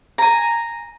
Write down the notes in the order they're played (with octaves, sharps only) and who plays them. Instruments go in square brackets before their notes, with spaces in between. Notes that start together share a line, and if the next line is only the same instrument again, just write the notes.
[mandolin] G#5 A#5